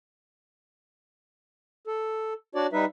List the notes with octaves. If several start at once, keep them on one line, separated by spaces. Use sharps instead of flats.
A4
D4 F#4 C#5 D5
G3 D#4 B4 E5